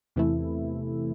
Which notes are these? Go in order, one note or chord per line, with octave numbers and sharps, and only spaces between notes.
E2 C3 E3 A3 E4